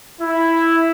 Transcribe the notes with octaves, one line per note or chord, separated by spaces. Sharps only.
E4